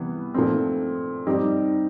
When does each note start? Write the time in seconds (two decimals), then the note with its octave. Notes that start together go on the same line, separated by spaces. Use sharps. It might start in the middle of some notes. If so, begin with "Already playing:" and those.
Already playing: C3 E3 G3 B3
0.34 A#2 F3 A3 C4
1.27 G3 C4 D#4 G4